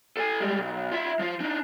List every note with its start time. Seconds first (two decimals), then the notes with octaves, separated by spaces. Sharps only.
0.17 A4 G#5
0.40 G3 G#3
0.58 B1
0.91 F4 E5
1.19 F3 F4
1.40 D4 D#4